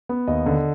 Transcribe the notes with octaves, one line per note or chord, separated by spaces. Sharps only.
B3
D#2 D#5
D3